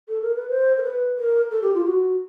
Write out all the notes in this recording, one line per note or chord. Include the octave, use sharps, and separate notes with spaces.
A4
A#4
B4
C5
A#4
B4
A#4
A4
G4
F4
F#4